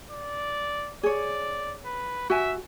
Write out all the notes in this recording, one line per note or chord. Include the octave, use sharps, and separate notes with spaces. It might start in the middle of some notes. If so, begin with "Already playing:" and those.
D5
G#4 C#5 D5
B4
F#4 E5 G#5